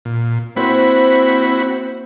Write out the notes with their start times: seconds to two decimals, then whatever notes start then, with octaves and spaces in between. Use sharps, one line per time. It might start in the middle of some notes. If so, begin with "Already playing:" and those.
0.05 A#2
0.57 A#3 C4 E4 F#4 C5 B5